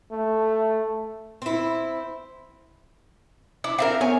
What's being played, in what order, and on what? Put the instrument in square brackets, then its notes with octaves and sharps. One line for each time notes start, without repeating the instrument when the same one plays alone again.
[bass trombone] A3
[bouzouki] C4 E4
[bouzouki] E4 [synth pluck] D6
[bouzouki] C4 E4 A#4 [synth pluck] E5 F5
[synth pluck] B3 [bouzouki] C#5 G#5